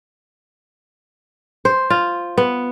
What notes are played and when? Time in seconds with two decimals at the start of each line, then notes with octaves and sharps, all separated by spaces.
1.65 C5
1.90 F4
2.37 B3